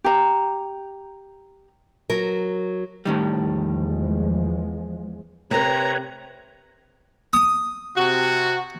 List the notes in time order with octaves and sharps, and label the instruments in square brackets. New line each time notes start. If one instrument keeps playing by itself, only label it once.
[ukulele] G4 A#5
[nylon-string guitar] F#3 A#4
[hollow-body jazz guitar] A2 D#3 G3
[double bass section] E2 F3 G#3
[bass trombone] C3 [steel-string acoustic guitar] C4 A#4 [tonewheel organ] B4 C#5 [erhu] A#5
[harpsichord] D#6
[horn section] C3 F#4